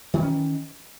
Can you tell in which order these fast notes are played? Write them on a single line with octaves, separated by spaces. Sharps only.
D#3 E3 C#4